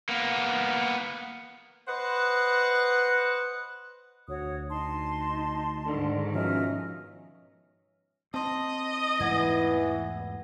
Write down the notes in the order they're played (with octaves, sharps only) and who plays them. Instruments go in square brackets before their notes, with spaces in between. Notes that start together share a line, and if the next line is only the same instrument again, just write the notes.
[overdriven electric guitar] A#3 B3
[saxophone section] B4 C5 D#5 F#5
[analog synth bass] D2 [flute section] F#4 C#5 D#6
[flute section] D#4 A5 C6
[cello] G#2 D#3 [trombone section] D3
[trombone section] B2 C#4 [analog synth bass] F3 [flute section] D#5 E5 F6
[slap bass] C4 [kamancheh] D#5 [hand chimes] A5 C6
[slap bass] E2 G#2 A3 [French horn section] E3 [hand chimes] F#5 G#6 A#6